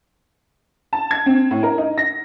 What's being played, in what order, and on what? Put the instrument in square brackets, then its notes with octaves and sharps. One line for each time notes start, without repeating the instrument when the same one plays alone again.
[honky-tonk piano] A5
G#6
C4
A2
A#4
D#4
A#6